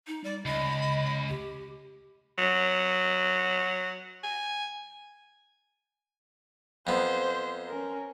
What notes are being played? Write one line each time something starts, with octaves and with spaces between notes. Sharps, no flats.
D#4
G3 D5
C#2 D#5 B5
G4
F#3
G#5
F2 B3 C5
C#4 A#4